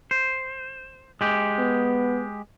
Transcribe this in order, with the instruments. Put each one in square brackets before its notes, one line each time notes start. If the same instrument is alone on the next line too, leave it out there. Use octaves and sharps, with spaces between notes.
[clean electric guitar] C5
G#3 G4
[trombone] B3